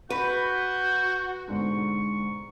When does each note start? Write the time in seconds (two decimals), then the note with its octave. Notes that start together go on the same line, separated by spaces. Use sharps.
0.10 F#4 B4 G6
1.48 G#2 B2 D3 C#6